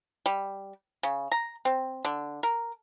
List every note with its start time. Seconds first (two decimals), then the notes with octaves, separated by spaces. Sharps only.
0.26 G3
1.03 C#3
1.32 A#5
1.65 C4
2.05 D3
2.43 A#4